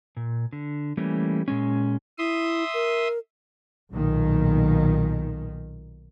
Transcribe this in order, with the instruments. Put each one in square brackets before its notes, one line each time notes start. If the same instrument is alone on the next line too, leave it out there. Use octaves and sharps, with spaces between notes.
[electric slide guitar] A#2
D3
E3 G3 A3 A#3 C#4
A#2 G#3 C#4
[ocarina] E4 [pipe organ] E5 C6 D#6
[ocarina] A#4
[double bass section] B1 A#2 D#3